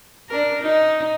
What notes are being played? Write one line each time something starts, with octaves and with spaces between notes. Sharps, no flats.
D4 A#4
D#4